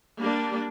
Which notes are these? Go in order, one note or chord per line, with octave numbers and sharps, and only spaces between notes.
G3 A#3 D4